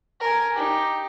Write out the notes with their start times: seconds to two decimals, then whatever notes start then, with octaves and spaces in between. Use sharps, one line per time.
0.20 A#4 G#5
0.54 D#4 G4